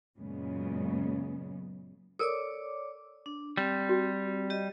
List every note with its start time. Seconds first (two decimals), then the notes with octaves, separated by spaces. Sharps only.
0.18 F#2 A#2 C#3 F#3 G#3 B3
2.19 A4 A#4 C#5 D5 D6
3.26 D4
3.57 G3 C4
3.89 F#4
4.50 G4 D#5